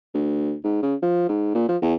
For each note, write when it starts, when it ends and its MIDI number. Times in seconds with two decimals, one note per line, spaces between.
0.14 0.55 38
0.64 0.78 44
0.82 0.95 49
1.02 1.27 53
1.29 1.53 44
1.55 1.68 46
1.68 1.77 53
1.82 1.94 40